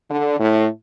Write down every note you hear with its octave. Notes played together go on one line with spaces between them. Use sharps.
D3
A2